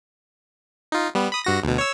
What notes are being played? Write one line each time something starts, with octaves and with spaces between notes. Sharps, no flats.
D#4 F4
G3 B3
B5 D#6
G2 F#4 A#6
D2 B2
C#5 E6